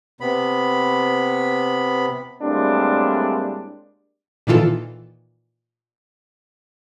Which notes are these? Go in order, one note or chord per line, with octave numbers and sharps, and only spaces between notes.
C3 B3 B5
A2 G3 G#3 A#3 C4 D4
A#2 D#3 E3 F4 A4